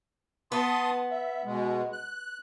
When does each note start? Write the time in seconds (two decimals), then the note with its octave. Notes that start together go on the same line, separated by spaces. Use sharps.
0.52 B3 A5 C6 D#6
1.10 E5
1.45 B2 G#3
1.92 F#6